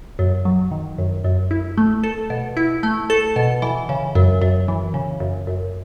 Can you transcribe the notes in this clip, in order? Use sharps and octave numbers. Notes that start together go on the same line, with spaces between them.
F#2
F#3
D#3
F#2
F#2
E4
A3
A4
B2
E4
A3
A4
B2
E3
C#3
F#2
F#2
E3
C#3
F#2
F#2